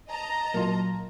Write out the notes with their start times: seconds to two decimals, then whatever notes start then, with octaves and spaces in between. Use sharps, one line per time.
0.10 D#5 A5 A#5
0.54 A#2 F#3 A#3 F4